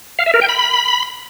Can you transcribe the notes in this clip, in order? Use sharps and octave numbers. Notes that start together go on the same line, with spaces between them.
F5
E5
A#4
G5
B5